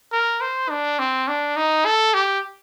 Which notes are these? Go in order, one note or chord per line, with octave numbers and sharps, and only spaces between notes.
A#4
C5
D4
C4
D4
D#4
A4
G4